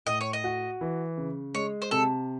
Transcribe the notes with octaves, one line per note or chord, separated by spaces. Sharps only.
A2 D#5
C#5
D#5
F#4
E3
C#3
G#3 C#5
C5
C3 A4